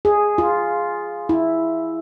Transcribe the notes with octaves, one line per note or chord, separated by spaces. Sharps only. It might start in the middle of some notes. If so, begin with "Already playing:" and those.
G#4
F4
E4